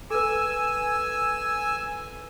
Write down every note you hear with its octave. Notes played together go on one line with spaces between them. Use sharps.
A4 B4 G#5 E6